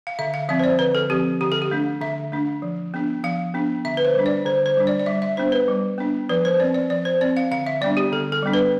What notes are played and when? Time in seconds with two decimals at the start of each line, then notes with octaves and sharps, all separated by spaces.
0.07 F5
0.19 D3 E5
0.34 F5
0.49 F3 C4 E5
0.59 C5
0.64 D5
0.79 D3 B4
0.95 A4
1.10 F3 C4 G4
1.41 D3 G4
1.52 A4
1.62 G4
1.71 A3 D4
2.01 D3 E5
2.32 A3 D4
2.62 F3
2.94 B3 D4
3.24 F3 F5
3.54 B3 D4
3.85 D3 E5
3.97 B4
4.05 C5
4.15 G3 D4
4.26 D5
4.45 D3 C5
4.66 C5
4.77 G3 D4
4.87 D5
5.00 D5
5.06 G3 E5
5.22 E5
5.37 B3 D4 C5
5.52 B4
5.68 G3
5.98 B3 D4
6.29 F3 B4
6.45 C5
6.60 C4 D5
6.74 D5
6.90 F3 D5
7.05 C5
7.21 C4 D5
7.37 F5
7.51 D3 F5
7.67 E5
7.81 G3 B3 D4 D5
7.97 G4
8.12 D3 A4
8.32 A4
8.43 G3 B3 D4
8.53 B4